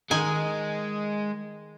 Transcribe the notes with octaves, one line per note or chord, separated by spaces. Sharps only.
D#3 G#3 G#5